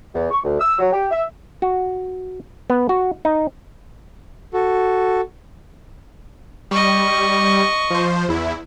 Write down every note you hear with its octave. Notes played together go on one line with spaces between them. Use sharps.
E2
C#6
D2
E6
F#3
G4
E5
F#4
B3
F#4
D#4
F#4 A4
G3 D#5 C#6
F3 C5
E2 E4